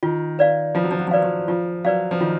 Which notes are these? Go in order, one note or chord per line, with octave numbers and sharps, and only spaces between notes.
D#3 F4
B4 D5 F5
F3 F4
F#3
F3
F#3
F3
F#3 B4 D5 F5
F3
F3 F4
F#3 B4 D5 F5
F3
D#3 F4